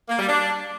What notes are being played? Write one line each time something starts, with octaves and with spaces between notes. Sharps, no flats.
A#3
G3
D4